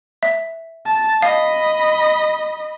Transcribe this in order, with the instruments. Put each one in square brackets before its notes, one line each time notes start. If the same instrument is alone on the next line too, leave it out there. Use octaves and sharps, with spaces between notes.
[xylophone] E5
[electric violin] A5
[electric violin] D#5 B5 [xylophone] F5